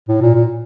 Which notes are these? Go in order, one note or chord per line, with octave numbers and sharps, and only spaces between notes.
A2
A#2
A#2